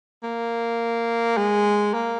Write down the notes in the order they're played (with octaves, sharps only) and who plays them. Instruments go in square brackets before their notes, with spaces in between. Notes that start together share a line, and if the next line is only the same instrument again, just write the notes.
[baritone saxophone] A#3
G#3
A#3